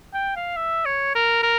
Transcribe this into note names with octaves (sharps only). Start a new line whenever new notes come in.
G5
F5
E5
C#5
A#4
A#4